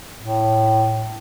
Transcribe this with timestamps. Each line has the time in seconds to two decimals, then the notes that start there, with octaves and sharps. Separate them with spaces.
0.19 A2